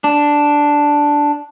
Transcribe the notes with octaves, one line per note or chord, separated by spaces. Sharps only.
D4